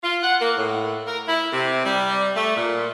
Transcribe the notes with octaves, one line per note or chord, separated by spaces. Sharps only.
F4
F#5
A#3
A2
A#4
E4
C3
G3
A3
A#2